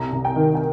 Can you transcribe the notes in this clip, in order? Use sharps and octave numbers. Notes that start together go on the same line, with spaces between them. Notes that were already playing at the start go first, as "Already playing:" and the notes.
Already playing: C2 A#5
C2
G5
D#3
G5